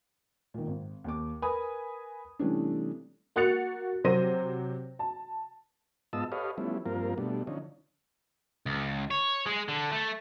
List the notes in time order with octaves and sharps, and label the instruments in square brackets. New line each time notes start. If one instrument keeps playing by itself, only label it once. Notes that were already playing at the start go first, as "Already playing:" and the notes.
[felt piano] A#2 D#3
G#1
D#2 D6
A#4 B4 G#5 B5 D#6
C3 E3 G3 A3 C#4 D4
[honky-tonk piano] A#3 F#4 F#6 A6 C#7 F7
C3 F#3 C5 A#6 D#7
A5
[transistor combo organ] G#2 B3 F4 D#5 A5 E6
G4 A4 B4 C#5 D#5 F5
F3 G3 A3 B3 C#4 E4
G2 F3 A#3 C4 F4 A#4
B2 G3 A3 D4
D3 F3 C#4 D#4
[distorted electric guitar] C#2
C#5
G#3
D3
A3